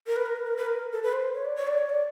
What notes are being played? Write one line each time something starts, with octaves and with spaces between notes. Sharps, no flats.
A#4
B4
A#4
B4
A#4
B4
A#4
A4
B4
C5
C#5
D5
C#5
D5
C#5
D5